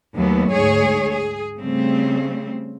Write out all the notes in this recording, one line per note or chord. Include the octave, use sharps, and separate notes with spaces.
D#2 F#3 A3 B3
D2 G#2 G#4 C#5
G#4
C#3 G3 A3 C4